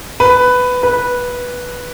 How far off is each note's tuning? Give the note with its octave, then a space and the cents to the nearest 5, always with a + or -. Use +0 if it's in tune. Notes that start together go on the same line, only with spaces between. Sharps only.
B4 +10
B4 -10